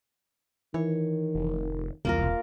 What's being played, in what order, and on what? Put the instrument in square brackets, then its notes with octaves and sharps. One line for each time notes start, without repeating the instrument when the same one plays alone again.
[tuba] D#3 [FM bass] E3 [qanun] C#5
[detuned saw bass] F1
[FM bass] E1 [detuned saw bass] C2 [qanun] A#3 F4 A#4